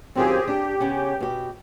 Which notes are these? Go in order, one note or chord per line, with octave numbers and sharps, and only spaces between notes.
F#2 D#3 C4 F4 G4 G#4
D4 G4
C#3 B3 C#4
B2 G4